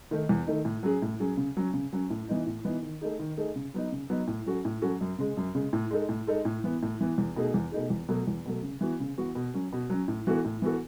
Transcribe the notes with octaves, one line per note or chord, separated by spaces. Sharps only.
D#3 A3 D#4
E2
D#3 A3 D#4
A2
F#3 C#4 G#4
A2
F#3 C#4 G#4
C#3
F#3 C#4
C#3
F#3 C#4
A2
E3 B3 D#4
A2
E3 B3 D#4
D#3
A3 D#4 G#4
D#3
A3 D#4 G#4
C#3
F#3 B3 D#4
C#3
F#3 B3 D#4
A2
F#3 C#4 F#4 A4
A2
F#3 C#4 F#4 A4
F#2
C#3 G#3
F#2
C#3 G#3
A2
G#3 D#4 A4
A2
G#3 D#4 A4
A2
E3 B3
A2
E3 B3
E2
B2 A3 D#4 G#4
E2
B2 A3 D#4 G#4
E2
B2 F#3 A3
E2
B2 F#3 A3
C#3
E3 B3 F#4
C#3
E3 B3 F#4
B2
F#3 C#4
B2
F#3 C#4
A2
E3 B3 F#4 A4
A2
E3 B3 F#4 A4